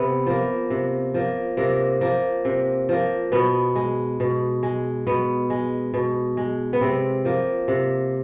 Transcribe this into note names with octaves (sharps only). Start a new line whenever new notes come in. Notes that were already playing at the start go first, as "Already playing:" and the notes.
Already playing: C3 B3
F3 A#3
C3
F3 A#3
C3 A#3
F3 A#3
C3
F3 A#3
B2 B3
G#3
B2
G#3
B2 B3
G#3
B2
G#3
B3
C3 C4
F3 A#3
C3